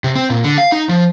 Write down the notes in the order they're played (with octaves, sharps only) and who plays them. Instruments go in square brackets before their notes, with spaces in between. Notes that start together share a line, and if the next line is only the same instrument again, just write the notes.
[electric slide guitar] C3
C4
A#2
D3
F5
D#4
F3